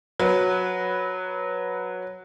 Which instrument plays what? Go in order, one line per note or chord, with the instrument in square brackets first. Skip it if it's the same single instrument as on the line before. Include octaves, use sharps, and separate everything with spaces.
[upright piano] F#3 B4